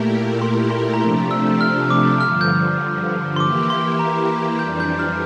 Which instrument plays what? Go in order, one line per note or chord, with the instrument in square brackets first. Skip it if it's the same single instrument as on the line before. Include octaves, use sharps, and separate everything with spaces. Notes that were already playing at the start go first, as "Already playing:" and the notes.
Already playing: [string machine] A#2 A3 E4 G4 A#4
[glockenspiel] C6
C6
A#5
[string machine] C3 F3 A3 D4 G4 [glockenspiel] C6
[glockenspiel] E6
F6
D6
[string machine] G2 D3 F3 [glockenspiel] F6
[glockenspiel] G6
C6
[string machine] E3 A#3 E4 G4 [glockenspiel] D6
[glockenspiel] C6
A#5
[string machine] F2 E3 G3 D4 [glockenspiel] G6
[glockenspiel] G6
F6